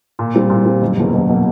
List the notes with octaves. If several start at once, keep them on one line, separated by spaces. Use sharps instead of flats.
A#2
G3 C4
A#2
G3 C4
F#1
E2 B2 F#3 A#3
F#1
B2 F#3 A#3